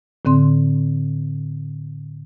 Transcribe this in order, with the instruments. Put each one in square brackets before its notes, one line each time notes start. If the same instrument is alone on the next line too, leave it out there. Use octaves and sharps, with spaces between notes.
[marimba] A2 D3 C4 C6